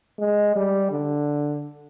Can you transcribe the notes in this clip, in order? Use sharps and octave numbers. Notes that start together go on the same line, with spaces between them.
G#3
G3
D3